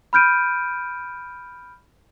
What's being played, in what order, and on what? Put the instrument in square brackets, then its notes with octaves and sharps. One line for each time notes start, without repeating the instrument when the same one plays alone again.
[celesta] B5 F6 G6 D7 D#7